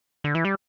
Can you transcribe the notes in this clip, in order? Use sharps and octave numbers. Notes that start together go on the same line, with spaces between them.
D3
E3
G3